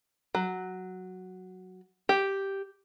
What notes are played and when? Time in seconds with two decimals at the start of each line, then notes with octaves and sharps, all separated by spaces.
0.35 F#3
2.09 G4